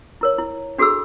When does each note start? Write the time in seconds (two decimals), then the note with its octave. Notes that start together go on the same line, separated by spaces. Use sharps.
0.21 E4 A#4 C#5
0.39 E4
0.78 D4 F#4 G#4 A4 B5 E6